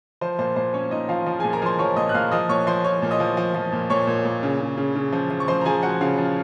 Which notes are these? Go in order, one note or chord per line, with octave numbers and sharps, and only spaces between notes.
F3 C5
A#2 C5
A#2 C5
A#2 C#4 C#5
A#2 D#4 D#5
F3 F4 F5
F3
A#2 G#4 G#5
A#4 A#5
F3 C5 C6
F3 C#5 C#6
A#2 D#5 D#6
F#6
A#2 F5 F6
F3 D#5 D#6
A#2 C#5 C#6
F3 C5 C6
F3 C#5 C#6
A#2
D#5 D#6
F3
F3
F3
A#2
A#2 C#5 C#6
A#2
A#2
C#3
C#3
C#3
C#3
F3
F3
C#6
F3 C5 C6
A#5
F3 G#4 G#5
F3 F#4 F#5
C#3 F4 F5
F3